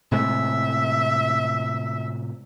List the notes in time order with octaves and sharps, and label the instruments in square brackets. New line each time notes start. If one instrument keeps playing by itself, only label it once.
[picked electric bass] A2 C3 G#3 [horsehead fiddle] E5